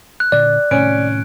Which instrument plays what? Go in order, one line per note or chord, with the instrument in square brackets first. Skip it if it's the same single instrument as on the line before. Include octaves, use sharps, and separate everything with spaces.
[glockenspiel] F#6
[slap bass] A#2 D3 [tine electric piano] D5
[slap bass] A2 C3 D#3 [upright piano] C#4 [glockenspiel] D7